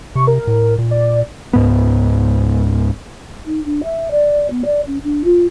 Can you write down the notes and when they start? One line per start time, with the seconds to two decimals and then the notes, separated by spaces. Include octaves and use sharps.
0.16 C3 C#6
0.27 A#4
0.47 A2
0.78 A#2
0.91 D5
1.53 C#2 G#2 B3
3.46 D#4
3.65 D4
3.83 E5
4.10 D5
4.50 B3
4.65 D5
4.86 C#4
5.03 D4
5.24 F4